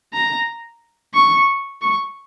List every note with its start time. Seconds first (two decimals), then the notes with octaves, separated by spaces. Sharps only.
0.13 A#5
1.14 C#6
1.81 C#6